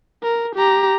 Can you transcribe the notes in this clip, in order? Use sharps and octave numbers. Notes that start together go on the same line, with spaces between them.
A#4
G4 A#5